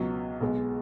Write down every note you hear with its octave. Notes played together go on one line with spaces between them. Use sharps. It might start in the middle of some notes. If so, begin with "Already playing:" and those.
Already playing: C#2 B2 F#3
B1 B2 G#3